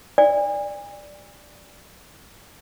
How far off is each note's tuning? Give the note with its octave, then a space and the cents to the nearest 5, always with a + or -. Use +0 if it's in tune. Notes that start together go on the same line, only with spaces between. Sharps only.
D5 +0 G#5 -40